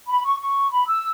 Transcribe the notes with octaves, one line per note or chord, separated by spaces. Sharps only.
B5
C#6
C#6
B5
E6